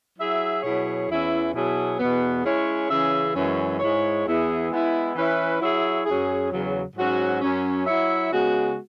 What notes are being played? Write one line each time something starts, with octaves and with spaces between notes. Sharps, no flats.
F#3 E4 G#4 E5
B2 F#3 E4 G#4 C#5
E2 E3 C#4 E4
B2 F#3 B3 E4 G#4
E2 B2 B3
G#3 C#4 E4 G#4 C#5
C#3 E3 C#4 G#4 E5
F#2 E3 G#3 C#4
G#2 G#3 E4 C#5
E2 E3 B3 E4 G#4
G#3 B3 E4
E3 C#4 E4 B4 E5
F#3 E4 G#4 C#5 E5
F#2 F#3 C#4 G#4
E2 C#3 F#3
G#2 F#3 C#4 F#4 C#5
F#2 F#3 C#4
F#3 E4 C#5 E5
C#3 G#3 B3 F#4